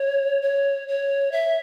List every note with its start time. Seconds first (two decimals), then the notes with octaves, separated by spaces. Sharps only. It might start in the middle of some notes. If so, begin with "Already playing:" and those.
Already playing: C#5
0.42 C#5
0.88 C#5
1.32 E5